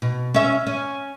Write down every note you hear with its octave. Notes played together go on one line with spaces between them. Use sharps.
B2
C#4 E5
C#4